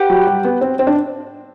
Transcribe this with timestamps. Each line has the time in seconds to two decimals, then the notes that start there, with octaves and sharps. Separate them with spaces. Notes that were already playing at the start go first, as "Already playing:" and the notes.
Already playing: G4 B4 F#5
0.10 F#3
0.27 G3
0.44 B3
0.61 C4
0.79 C4
0.87 D4